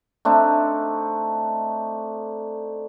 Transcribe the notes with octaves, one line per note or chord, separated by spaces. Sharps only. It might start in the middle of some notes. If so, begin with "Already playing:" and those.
A3 C4 D4 D#4